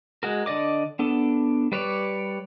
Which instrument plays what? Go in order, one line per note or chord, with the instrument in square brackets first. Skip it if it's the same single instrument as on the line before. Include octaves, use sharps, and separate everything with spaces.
[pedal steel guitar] G#3 F#4 A#4
D3 D5 D#5 D6
B3 D4 A4
G3 B4 C#5 D5